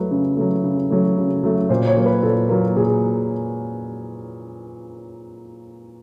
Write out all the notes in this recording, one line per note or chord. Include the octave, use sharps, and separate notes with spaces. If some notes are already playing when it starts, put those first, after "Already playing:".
Already playing: F#3 A3 B4
C#3
F#3 A3
C#3
F#3 A3
C#3
F#3 A3
A#2 C5
C#5
F#3 A#3
B4
A#2 A4
F#3 A#3
A#2 G#4